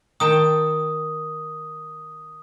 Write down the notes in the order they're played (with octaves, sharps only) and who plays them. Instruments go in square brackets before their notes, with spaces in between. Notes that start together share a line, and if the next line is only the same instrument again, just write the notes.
[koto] D#3 G5 A5 [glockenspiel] D#6